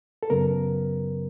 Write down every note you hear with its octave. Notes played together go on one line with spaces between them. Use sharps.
A4
F#2 C#3 F#3 B3 A#4